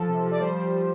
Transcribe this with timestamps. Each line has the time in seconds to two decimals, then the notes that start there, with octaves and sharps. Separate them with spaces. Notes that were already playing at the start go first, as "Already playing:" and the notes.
Already playing: F3 A4
0.09 C3
0.24 F3
0.31 D5
0.40 G3 C5
0.56 G3
0.73 F3